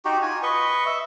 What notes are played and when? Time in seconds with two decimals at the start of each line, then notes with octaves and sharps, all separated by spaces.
0.05 D#4 F#4 G4
0.22 F4 F#4 G#5
0.43 B4 D#5 C#6
0.86 E5